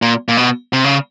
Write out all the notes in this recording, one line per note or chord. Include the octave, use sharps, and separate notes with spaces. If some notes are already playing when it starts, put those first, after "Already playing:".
A#2
A#2
B2
C3
C#3